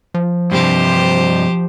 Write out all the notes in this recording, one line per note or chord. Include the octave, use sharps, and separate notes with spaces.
F3
G2 C3 G4 C5